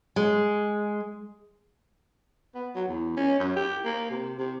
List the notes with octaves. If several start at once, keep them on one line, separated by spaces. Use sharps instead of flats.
G#3
B3
F#3
E2
C#4
F#2
G4
A#3
C3
C3